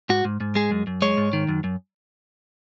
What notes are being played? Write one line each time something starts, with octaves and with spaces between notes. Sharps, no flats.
G#2 F#4
G#2
G#2
G#3 G#4
F#2
F#2
G#3 C#5
G#2
D#3
F#2
F#2